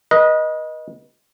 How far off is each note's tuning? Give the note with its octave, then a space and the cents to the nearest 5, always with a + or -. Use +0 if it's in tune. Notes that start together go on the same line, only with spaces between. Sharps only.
B4 -35 D#5 +0